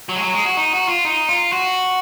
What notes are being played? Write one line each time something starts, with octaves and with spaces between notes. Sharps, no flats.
F#3
G#3
F#3
G#3
F#4
D#4
F#4
F4
D#4
F4
F#4